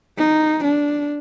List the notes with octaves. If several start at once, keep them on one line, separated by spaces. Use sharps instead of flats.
D#4
D4